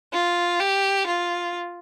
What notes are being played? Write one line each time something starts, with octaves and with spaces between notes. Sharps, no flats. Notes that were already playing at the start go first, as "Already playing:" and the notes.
F4
G4
F4